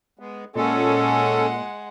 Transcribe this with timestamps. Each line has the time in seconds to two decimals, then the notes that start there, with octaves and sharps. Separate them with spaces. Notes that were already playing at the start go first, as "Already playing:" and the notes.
0.19 G#3 B3
0.56 A#2 G#3 C#4 A4 F#5